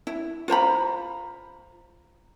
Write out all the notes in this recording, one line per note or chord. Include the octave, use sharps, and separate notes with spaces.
E4
F4 C5 A#5 B5